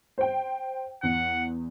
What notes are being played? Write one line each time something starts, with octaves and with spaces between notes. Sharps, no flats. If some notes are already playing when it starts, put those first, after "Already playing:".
C5 G5
E2 F#5